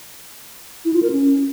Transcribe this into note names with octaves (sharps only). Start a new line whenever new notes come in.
E4
F4
A#4
C#4